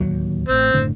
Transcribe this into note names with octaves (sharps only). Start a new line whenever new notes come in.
D1 D#2 F#3
A1 A2 C4
F#1 A2 D3